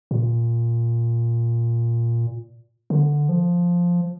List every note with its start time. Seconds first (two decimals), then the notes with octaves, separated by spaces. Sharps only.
0.11 A#2
2.90 D3
3.29 F3